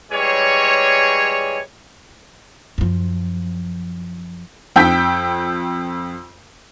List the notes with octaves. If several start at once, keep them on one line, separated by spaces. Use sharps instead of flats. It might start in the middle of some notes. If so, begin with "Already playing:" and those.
E3 G3 G#3 G#4 C#5
F#2 F3
F2 G5 E6 G6 B6